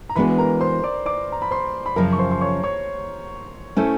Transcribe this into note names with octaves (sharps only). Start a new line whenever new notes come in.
A#5
E3 G#3 B3 D4 F#4 B4 B5
A#4 A#5
C5 C6
D5 D6
D5 D6
A#5
B5
C5 C6
B5
F#2 C#3 F3 A#4 A#5
C#6
C5 C6
C6
C#5 C#6
C#5 C#6
A3 C#4 E4 A4 C5